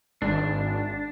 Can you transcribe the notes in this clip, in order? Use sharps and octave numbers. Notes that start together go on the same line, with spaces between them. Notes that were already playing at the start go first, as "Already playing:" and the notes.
G#1 D4